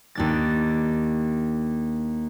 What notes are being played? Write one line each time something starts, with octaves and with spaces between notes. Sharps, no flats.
D#2 D4 A6